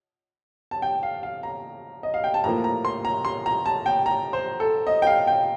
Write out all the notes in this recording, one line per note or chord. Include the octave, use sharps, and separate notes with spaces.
A5
G5
F5
F5
A#5
D#5
F5
G5
A5
A2 F3 A#3 A#5
A#5
C6
A#5
C6
A#5
A5
G5
A#5
C5
A4
D#5
G5
F5
G5